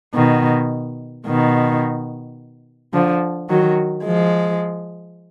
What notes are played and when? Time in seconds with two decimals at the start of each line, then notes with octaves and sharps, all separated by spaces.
0.15 B2 D#3
1.27 B2 D#3
2.94 D3 F3
3.49 D#3 F#3
4.05 F3 G#3